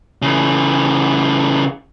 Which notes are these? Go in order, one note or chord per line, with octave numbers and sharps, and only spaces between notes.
C#3 E3